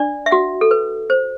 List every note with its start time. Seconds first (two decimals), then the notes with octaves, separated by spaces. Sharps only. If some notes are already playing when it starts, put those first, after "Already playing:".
Already playing: D4 D5
0.26 E5
0.31 F#4 F#5
0.61 A4
0.71 B4
1.10 C5